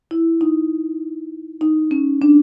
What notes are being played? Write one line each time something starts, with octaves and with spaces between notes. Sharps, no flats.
E4
D#4
D#4
C#4
D4